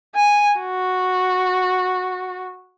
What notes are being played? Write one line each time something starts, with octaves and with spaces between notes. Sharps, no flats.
G#5
F#4